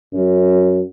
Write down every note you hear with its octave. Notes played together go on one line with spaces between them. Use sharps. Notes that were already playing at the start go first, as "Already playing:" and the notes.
F#2